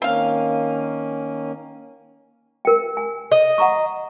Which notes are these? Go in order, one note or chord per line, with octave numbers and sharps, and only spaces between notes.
D#3 A#3 C4 C#4 F5
A#4 G5
G#5
D#5
F#5 A#5 C#6